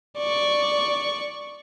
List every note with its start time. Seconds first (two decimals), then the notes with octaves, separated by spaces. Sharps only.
0.18 D5 C#6